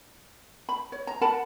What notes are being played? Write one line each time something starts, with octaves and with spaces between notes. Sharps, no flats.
B5
C#5
A#5
A#4 F#5 A5 B5